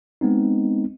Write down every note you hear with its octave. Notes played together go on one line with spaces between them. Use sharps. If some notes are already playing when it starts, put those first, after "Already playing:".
G#3 B3 C4 D#4